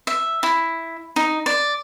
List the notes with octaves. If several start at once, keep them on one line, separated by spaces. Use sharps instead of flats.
E5
E4
D#4
D5